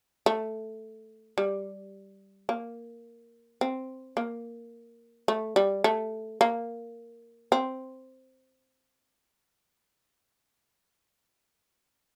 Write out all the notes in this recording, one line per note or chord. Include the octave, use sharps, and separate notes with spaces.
A3
G3
A#3
C4
A#3
A3
G3
A3
A#3
C4